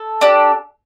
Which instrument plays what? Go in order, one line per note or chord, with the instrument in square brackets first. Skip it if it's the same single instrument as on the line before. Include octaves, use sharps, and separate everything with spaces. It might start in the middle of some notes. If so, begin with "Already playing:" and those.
Already playing: [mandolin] A4
D4 G4